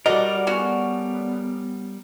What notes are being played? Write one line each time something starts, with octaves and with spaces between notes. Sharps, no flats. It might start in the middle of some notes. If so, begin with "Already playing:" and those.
G3 F#4 A4 A#4 D5 D#5 F#5
B3 C#4 F#4